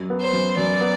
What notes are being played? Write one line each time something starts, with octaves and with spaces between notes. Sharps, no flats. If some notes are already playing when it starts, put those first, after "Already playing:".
Already playing: F#2
B3
C5
F#2
F#2 D5
B3